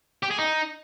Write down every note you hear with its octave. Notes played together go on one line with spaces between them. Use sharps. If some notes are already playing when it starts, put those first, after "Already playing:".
G4
G#4
D#4